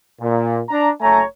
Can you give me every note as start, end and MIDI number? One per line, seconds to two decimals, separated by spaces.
0.20 0.60 46
0.69 0.89 62
0.69 0.89 82
1.01 1.22 30
1.01 1.22 57
1.01 1.22 73
1.01 1.22 80
1.01 1.22 82